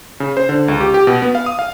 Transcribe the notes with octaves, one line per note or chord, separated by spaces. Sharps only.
C#3
C5
D3
C#2
G4
G4
B2
B3
F5
D#6
F5